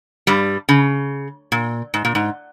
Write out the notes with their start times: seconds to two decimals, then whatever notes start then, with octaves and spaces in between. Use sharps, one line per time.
0.27 G2 G3
0.69 C#3
1.52 A#2
1.94 G#2
2.05 A#2
2.15 G#2